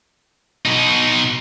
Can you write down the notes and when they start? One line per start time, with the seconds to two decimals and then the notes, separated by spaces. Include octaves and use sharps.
0.65 B2 D#4